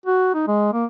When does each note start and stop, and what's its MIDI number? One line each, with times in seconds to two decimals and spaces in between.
0.06 0.31 66
0.34 0.46 63
0.47 0.72 56
0.73 0.85 58